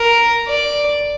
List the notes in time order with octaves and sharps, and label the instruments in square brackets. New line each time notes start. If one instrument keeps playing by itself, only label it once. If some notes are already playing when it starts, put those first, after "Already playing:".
Already playing: [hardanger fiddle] A#4
D5